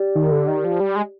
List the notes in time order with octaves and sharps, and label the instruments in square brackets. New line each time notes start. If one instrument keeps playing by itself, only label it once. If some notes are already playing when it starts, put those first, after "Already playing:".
Already playing: [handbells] G4 D5
[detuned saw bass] D#3
D3
D#3
F3
G3
G#3